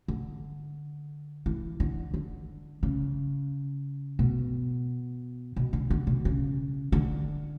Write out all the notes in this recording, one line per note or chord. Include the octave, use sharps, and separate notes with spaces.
D3
E3
D3
D3
C#3
B2
B2
D3
D3
B2
C#3
D3